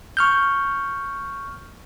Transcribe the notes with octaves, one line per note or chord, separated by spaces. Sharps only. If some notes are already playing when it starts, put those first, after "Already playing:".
C#6 F6 G6